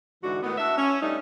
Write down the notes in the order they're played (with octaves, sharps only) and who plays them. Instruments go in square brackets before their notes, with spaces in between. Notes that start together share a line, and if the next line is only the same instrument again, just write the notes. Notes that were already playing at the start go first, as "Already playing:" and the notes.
[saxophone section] G#2 D3 E3 F#4
A2 D#3 B3
D4 F#4 E5
C#4
G3 A3 D4 D#4